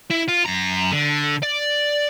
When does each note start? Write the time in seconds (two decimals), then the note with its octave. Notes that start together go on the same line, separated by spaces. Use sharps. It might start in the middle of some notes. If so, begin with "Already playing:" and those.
0.10 E4
0.28 F4
0.45 F#2 A#5
0.92 D3
1.42 D5